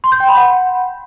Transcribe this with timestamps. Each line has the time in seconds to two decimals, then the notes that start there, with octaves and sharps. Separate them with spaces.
0.04 C6
0.12 G6
0.20 G5
0.28 B5
0.37 F#5